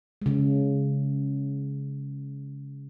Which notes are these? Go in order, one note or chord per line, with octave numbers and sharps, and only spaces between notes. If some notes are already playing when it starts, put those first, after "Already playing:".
C#3 G#3